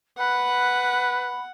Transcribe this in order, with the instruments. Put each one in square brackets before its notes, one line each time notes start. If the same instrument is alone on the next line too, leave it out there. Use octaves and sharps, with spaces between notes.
[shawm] B4 [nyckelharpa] F#5 [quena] B5